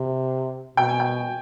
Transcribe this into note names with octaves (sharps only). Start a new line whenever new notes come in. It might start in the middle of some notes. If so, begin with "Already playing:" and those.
Already playing: C3
B2 G5
G#5
G5